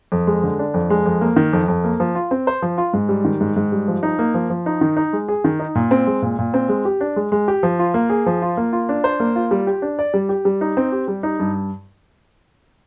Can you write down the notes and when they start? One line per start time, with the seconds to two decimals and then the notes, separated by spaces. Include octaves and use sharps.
0.12 F2
0.27 G#3
0.44 D3
0.59 D4
0.74 F2
0.90 G#3
1.06 F2
1.21 A#3
1.36 D#3
1.53 F2
1.68 F2
1.84 A#3
2.00 F3
2.15 F4
2.31 C4
2.47 C5
2.62 F3
2.78 F4
2.93 G#2
3.09 G3
3.25 D#3
3.40 G#2
3.56 G#2
3.72 G3
3.88 F3
4.03 D#4
4.19 A#3
4.34 F3
4.50 F3
4.66 D#4
4.81 D#3
4.97 D#4
5.13 G#3
5.28 G#4
5.44 D#3
5.60 D#4
5.75 A#2
5.91 C4
6.07 G#3
6.22 A#2
6.39 A#2
6.54 C4
6.69 G#3
6.85 G4
7.01 D4
7.16 G#3
7.32 G#3
7.48 G4
7.63 F3
7.79 F4
7.94 A#3
8.10 G#4
8.26 F3
8.42 F4
8.57 A#3
8.73 F4
8.89 D4
9.04 C5
9.20 A#3
9.36 F4
9.51 G3
9.67 G4
9.82 D4
9.99 D5
10.14 G3
10.29 G4
10.45 G3
10.61 D#4
10.77 C4
10.92 G4
11.08 G3
11.23 D#4
11.39 G2